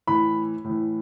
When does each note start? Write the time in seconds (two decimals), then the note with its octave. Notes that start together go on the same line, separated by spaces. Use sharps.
0.07 A2 E3 B5
0.64 A2
0.70 E3